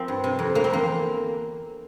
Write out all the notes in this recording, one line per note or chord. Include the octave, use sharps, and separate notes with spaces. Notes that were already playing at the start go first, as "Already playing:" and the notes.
Already playing: F3 C4 A#4
G2
C3
F2
D3 A#3
C4
E2 A#3